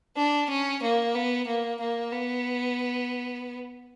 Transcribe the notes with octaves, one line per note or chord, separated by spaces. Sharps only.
D4
C#4
A#3
B3
A#3
A#3
B3